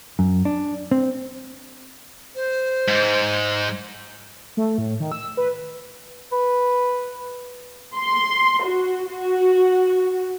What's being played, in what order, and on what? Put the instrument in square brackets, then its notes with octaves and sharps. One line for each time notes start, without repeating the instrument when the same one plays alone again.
[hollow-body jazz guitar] F#2
D4
C4
[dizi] C5
[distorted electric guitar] G#2
[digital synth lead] A3
A2
D#3
E6
B4
[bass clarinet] B4
[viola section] C6
F#4
F#4